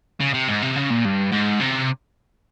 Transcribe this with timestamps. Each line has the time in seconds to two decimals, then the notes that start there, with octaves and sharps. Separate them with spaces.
0.20 C#3
0.34 C3
0.48 G#2
0.62 C3
0.76 C#3
0.90 A#2
1.05 G2
1.32 G#2
1.61 C3